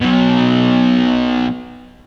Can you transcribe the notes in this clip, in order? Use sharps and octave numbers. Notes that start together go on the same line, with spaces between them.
B2 F#3